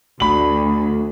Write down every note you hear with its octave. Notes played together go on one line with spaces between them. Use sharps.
D2 B5 F#7